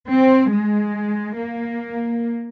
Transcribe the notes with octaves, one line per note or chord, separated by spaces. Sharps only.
C4
G#3
A#3